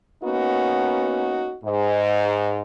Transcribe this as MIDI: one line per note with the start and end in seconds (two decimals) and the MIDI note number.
0.23 1.55 58
0.23 1.55 59
0.23 1.55 61
0.23 1.55 63
0.23 1.55 66
1.64 2.62 44